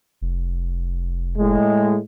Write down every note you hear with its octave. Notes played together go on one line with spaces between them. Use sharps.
F1
A2 G#3